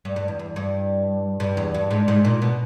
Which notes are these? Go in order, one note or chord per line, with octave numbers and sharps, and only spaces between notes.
G2
G2
E2
E2
G2
G2
E2
G2
G#2
G#2
A#2
B2